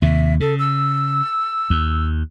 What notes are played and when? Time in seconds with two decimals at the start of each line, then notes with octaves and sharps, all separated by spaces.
0.02 D#2 C3 E5
0.40 C#3 A4
0.59 E6
1.70 D#2